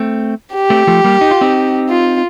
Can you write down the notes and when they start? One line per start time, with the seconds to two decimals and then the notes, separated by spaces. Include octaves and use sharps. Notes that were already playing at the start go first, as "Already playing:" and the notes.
Already playing: A3 C4
0.54 G4
0.70 A3 C4
0.87 F3 A3
1.04 G3 A#3
1.21 D#4
1.31 F4
1.41 C4 D#4
1.89 F4